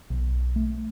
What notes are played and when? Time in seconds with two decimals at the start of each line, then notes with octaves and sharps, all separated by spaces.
0.10 B1
0.56 A3